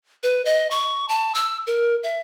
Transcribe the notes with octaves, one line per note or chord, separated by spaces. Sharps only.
B4
D#5
C#6
A5
E6
A#4
E5